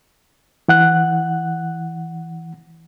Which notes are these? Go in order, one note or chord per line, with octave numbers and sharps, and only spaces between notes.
E3 F#5 F#6